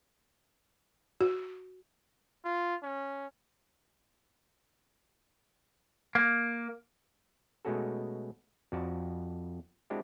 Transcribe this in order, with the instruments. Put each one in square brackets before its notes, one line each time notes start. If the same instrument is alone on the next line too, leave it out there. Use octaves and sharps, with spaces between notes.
[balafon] F#4
[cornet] F4
C#4
[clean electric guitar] A#3
[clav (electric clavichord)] B2 G#3 A3 C#4 F#4 A4
F2 F#4 D5 A5
G#3 C4 D4 E4 F#4 G4